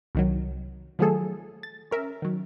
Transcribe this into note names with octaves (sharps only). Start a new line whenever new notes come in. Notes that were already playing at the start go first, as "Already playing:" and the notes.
C2 D#3 F#3
D#3 F3 F#3 A3 G#4 A4
A6
C#4 A#4 E5
D#3 F#3